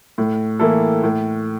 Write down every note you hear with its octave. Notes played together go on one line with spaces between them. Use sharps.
A2
E3 A#3 E4 A4
A2